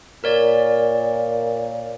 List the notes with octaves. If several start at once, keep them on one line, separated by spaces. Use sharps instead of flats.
A#2 A#4 C#5 D5